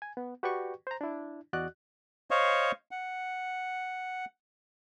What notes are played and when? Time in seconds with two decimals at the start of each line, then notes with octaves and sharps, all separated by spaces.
0.02 G#5
0.17 B3
0.43 F#4 G4 B4 D5 G5 C#6
0.87 C5 A#5
1.01 D4 E4
1.53 E2 F#4 D5 D#5 F#6
2.31 C5 C#5 D#5 F5 C#6
2.91 F#5